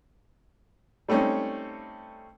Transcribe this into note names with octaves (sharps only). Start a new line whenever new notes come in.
G3 A3 C4 C#4 D#4